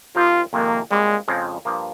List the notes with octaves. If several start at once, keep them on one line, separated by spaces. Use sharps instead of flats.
F3 C4 D#4 F4 G4 A#4
F2 C3 D#3 G#3 A#3
A#2 G3 G#3 C4
F2 C#3 F3 G#3 C4
G2 F3 A#3